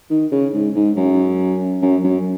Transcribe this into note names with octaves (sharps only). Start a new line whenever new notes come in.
D#3
C#3
G#2
G#2
F#2
F#2
F#2